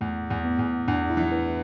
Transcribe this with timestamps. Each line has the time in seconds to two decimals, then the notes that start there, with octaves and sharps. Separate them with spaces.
0.01 E2 A3
0.30 E2
0.45 B3
0.59 E2
0.88 E2 D4
1.10 E4
1.17 E3
1.32 B4